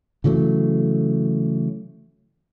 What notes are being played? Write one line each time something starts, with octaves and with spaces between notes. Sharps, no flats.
C#3 E3 F#3 A3